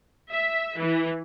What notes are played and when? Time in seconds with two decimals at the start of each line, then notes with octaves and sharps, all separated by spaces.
0.31 E5
0.78 E3